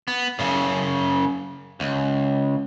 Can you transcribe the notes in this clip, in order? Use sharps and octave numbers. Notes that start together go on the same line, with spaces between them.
B3
F#2 C#3
C#2